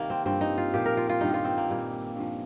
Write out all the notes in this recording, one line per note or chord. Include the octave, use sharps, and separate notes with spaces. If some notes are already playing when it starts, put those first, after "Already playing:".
Already playing: C3 D#3 G3 A#3
C4
G2 F3 C4
D#4
F4
A#2 F3 G4
A#4
F4
F4
G2 D#3 G3 D#4
F4
C4
A#3
A#2 G3
G2 F3